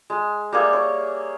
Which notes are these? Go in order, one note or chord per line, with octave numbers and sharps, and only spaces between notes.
G#3
G3 A#3 G#4 E5
C#5